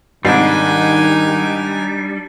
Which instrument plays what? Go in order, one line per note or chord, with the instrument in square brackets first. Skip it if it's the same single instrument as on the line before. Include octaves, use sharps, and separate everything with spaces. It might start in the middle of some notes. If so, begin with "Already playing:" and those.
[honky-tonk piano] G#2 C4 C7 [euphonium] D#3 [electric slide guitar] G3 D4 [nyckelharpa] D#4 G#5